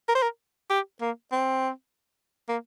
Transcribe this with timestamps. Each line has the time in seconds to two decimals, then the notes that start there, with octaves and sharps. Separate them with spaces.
0.09 A#4
0.15 C5
0.23 A#4
0.70 G4
1.01 A#3
1.32 C4
2.49 A#3